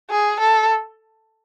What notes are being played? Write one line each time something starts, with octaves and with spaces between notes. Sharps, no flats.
G#4
A4